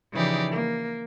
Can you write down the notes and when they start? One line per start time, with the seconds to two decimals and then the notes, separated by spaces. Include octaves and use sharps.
0.14 C#3 E3 F3 D#4 G4 D5
0.52 A#3